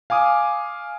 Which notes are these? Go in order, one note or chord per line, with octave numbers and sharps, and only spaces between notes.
F5 G#5 D6 D#6